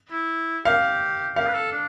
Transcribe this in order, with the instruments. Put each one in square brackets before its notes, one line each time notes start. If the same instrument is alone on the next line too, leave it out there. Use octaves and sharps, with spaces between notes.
[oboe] E4
[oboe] G4 [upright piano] F5
[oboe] G4 [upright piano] F5
[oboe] B4
A4
D4